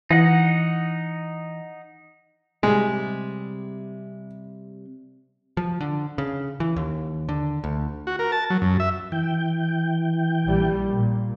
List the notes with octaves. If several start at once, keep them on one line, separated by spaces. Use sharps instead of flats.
E3 D#4 D#5 F#5
C3 G3 G#3
F3
D3
C#3
E3
D#2
D3
D2
F#4
A#4
A5
F#3
F#2
E5
E3 G5
A#1 G3
A#2